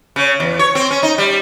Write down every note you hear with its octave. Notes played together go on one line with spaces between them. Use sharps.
C#3
E2
C#5
C4
C#4
D#4
G3